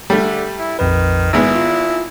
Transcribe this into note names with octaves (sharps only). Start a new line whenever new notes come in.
D3 G3 A3
E4
A#1 F2 D#3 B4
G#1 G#3 B3 E4
F4